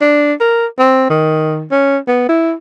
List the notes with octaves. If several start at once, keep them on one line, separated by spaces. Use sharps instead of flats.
D4
A#4
C4
D#3
C#4
B3
E4